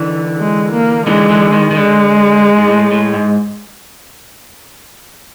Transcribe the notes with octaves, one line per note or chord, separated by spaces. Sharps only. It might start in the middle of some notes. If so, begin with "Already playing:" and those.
Already playing: D3 E3
G#3
A#3
D3 E3 G#3
D3 E3
D#3
D#3
D3 G#3
G#2
A2
A2
G#2